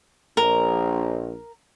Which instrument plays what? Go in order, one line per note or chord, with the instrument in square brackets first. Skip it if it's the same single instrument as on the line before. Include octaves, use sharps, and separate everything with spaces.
[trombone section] A#1 [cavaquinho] A#4